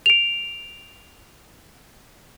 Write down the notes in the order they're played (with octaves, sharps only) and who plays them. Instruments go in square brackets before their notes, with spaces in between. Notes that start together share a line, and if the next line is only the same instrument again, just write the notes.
[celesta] D7 F7